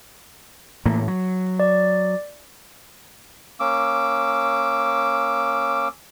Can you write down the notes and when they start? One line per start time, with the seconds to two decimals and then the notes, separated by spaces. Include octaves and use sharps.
0.86 A2 E3 A#3
1.08 F#3
1.60 D5
3.60 A#3 C#4 D6 E6